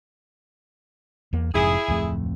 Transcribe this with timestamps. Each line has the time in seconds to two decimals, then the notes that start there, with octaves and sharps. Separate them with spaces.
1.33 E2 A#3
1.54 F1 F2 G#2 E4 G#4
1.88 D1 F2 A3